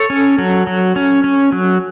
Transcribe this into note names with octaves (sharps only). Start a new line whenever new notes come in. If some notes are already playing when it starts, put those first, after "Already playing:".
Already playing: A4 C#5
C#4
F#3
F#3
C#4
C#4
F#3